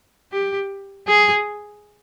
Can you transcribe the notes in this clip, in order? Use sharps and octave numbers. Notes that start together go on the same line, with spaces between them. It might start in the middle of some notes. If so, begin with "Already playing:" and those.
G4
G#4